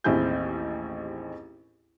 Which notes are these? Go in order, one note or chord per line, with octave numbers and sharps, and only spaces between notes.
A1 D#2 C4 E4 G#4 G6